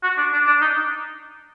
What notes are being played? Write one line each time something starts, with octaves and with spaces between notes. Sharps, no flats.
F#4
D4
D4
D4
D#4